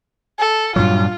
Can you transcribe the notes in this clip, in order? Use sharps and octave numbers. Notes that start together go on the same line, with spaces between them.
A4
G2 A#2 F#3 F4